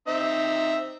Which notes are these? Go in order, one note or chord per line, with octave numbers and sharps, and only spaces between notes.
C4 D#4 E5